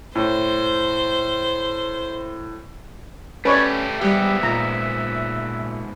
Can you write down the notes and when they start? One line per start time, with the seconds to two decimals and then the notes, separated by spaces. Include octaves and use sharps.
0.16 A2 C5
3.45 A3 C#4 G4 B4 C#5 D5
4.01 G#2 G3 B3 G4 E5
4.43 A#2 A#5